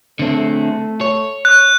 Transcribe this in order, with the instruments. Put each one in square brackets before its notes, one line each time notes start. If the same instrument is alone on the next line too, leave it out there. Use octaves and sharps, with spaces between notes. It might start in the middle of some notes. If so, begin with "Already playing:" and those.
[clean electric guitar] D3 C4 [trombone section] A3 A4
[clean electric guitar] C#5
[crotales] F#6